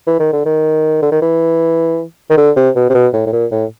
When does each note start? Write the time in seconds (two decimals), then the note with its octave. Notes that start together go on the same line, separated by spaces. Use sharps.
0.07 E3
0.20 D#3
0.33 D3
0.46 D#3
1.02 D3
1.12 D#3
1.22 E3
2.30 D#3
2.37 D3
2.56 C3
2.76 B2
2.90 C3
2.94 B2
3.13 A2
3.27 A2
3.33 A#2
3.51 A2